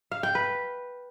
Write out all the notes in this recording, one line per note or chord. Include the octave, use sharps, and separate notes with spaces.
F5
G5
B4